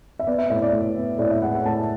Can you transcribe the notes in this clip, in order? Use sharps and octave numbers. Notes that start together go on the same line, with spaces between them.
E5
B3 D5
E5
A2 E5
D5
A2
B3
A2 D5
E5
G#3 F#5
F#5
A2 A5